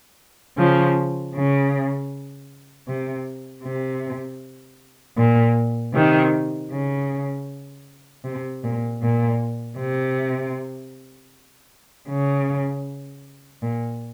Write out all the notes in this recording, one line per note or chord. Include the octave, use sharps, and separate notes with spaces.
C#3 F3
C#3
C3
C3
A#2
C3 D#3
C#3
C3
A#2
A#2
C3
C#3
A#2